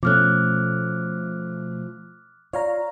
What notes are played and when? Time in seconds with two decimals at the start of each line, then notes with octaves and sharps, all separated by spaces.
0.03 B2 F3 A3 C#4 D6 F6 F#6
2.53 F4 C#5 D5 F5 A#5